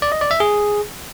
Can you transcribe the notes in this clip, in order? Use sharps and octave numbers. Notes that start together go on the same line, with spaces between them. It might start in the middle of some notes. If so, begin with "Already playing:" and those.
D5
D#5
D5
E5
G#4